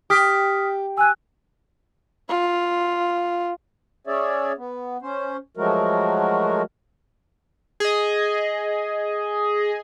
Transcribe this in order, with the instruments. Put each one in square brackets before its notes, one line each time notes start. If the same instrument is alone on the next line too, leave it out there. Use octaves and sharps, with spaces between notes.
[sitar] G4 [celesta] D#6 F6 B6
[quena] G#5 [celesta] E6 F#6
[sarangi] F4
[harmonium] C#4 G#4 C#5 D5 E5
B3
C#4 C5
F3 F#3 G#3 A3 F#4 A#4
[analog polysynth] G#4 D#5